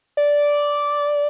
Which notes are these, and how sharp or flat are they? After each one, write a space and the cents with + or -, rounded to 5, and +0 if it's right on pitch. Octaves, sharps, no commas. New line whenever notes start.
D5 -10